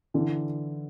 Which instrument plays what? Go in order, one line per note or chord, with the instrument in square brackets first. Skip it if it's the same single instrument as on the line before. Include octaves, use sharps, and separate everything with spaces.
[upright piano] D3 E3